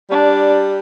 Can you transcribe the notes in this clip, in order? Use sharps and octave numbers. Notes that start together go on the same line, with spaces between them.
G3 D4